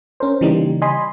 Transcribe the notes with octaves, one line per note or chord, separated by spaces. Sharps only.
C#4 A#4 C5
C#3 E3 G3 A#3 D#4
D#5 G#5 B5 C6